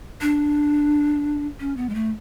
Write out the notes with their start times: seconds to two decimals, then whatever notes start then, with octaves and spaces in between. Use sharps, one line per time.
0.21 D4
1.60 C#4
1.77 B3
1.89 G#3
1.95 A3